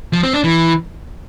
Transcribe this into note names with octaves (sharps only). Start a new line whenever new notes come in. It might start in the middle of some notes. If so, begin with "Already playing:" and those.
F3
C4
D4
E3